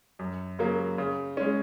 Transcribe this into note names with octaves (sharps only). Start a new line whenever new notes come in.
F#2
C#3 F#3 A#3
C#3
G#3 C#4